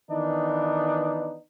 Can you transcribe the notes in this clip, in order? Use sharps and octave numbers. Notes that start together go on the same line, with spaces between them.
D#3 E3 B3 D4 D#4